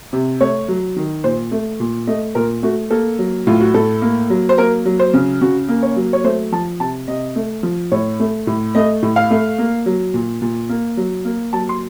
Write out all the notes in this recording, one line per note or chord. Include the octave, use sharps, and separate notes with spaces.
C3
A3 C#5
F#3
D#3
A#2 C5
A3
A#2
A3 D#5
A#2 A#4
A3 F#4
A#3 A4
F#3
A2 F4
F#4
A2 A4
A#3
F#3
C5
A#3 A#4
F#3
C5
C#3
C#3 F#4
A#3
C#5
F#3
C#5
A3 C5
F3 A5
C3 A5
C3 D#5
A3
F3
A2 C#5
A3
A2
A3 D#5
A2
F5
A3
A#3
F#3
A#2
A#2
A#3
F#3
A#3
F#3 A5
C6